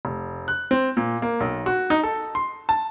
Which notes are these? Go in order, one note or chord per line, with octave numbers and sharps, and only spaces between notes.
F1
F#6
C4
A#2
A#3
B1
F#4
D#4
A4
C6
A5